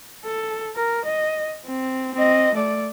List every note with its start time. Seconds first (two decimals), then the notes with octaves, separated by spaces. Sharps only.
0.25 A4
0.76 A#4
1.05 D#5
1.66 C4
2.15 C4 D#5
2.55 A3 D5